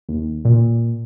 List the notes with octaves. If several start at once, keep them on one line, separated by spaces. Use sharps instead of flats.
D#2
A#2